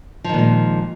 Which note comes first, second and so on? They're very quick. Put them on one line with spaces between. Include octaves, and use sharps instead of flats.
F3 D#3 A#2 G#3